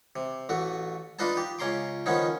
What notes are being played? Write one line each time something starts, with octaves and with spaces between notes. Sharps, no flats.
C3
A1 A3 F#4
D4 D#4 F4 B4 D#5 A5
G4
C#2 C#4 A#5 C6 D6
D#3 F3 B3 C#4 D#4